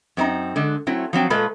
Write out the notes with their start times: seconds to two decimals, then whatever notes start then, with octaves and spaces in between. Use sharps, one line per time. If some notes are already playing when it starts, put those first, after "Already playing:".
0.17 F#2 C4 D#4 A#5
0.56 D3 G#3
0.87 F#3 A3 C4 E4
1.13 F3 F#3 C4 G5
1.30 A#2 G#3 A3 F4 A4 B4